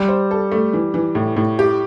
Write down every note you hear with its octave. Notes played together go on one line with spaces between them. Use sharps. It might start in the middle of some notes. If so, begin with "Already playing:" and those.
Already playing: G3
C5
A4
A3
E3
E3
A2
A2
G4